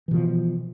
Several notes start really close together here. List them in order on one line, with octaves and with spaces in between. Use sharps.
E3 B2 F3